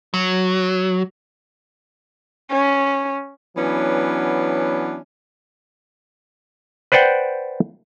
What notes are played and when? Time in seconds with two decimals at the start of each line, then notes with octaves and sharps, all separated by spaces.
0.14 F#3
2.51 C#4
3.57 E3 F#3 B3 C#4 D4
6.92 B4 C5 D5 F#5 G5